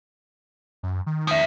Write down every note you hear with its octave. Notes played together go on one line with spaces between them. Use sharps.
F#2
D#3
F3 E5